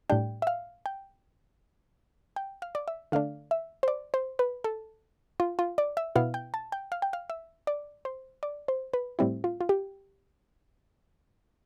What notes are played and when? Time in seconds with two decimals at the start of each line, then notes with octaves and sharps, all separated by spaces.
0.10 A2 G3 D4 G5
0.42 E5
0.47 F5
0.86 G5
2.36 G5
2.62 F5
2.75 D5
2.88 E5
3.12 D3 A3 D4 F5
3.51 E5
3.83 C5
3.88 D5
4.14 C5
4.39 B4
4.64 A4
5.40 F4
5.59 F4
5.78 D5
5.97 E5
6.16 B2 B3 E4 F5
6.34 G5
6.54 A5
6.72 G5
6.92 F5
7.02 G5
7.13 F5
7.30 E5
7.67 D5
8.05 C5
8.43 D5
8.68 C5
8.93 B4
9.19 A2 G3 C4 E4
9.44 F4
9.61 F4
9.69 G4